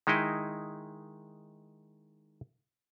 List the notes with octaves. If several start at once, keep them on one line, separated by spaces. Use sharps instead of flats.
D#3 G#3 D#4 E4 D#5